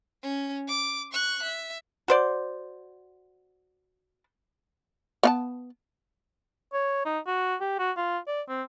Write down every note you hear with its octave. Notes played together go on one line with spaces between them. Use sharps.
C#4
D6
C#6 F#6
E5
F#4 C5 D5
B3 F5 A5
C#5
D#4
F#4
G4
F#4
F4
D5
C4